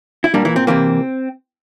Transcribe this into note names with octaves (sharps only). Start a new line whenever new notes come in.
E4
A#2 G3 A#3 D4
E3 E4
C4
C3 E3 A#3 C4